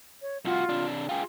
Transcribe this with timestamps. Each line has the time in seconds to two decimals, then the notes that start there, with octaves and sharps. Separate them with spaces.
0.22 C#5
0.45 C2 F4 F#4
0.69 C3 D4
1.09 F4 G#4 G5